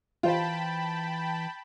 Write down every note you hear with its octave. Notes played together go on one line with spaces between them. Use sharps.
E3 F4 C5 G5 A5 B5